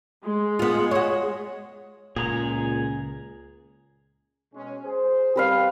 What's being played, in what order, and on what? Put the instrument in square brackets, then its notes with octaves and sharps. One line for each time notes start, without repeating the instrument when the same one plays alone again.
[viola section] G#3
[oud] B3 F4
F#4 C#5
[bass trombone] C#2 [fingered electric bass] A#2 [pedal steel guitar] G#4 A#5
[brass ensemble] B2 G#3 C#4
G#4 C5
[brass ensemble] G3 C4 [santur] G4 B4 F5